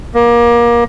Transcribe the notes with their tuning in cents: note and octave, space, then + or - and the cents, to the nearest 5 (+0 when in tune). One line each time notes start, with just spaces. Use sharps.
A#3 +25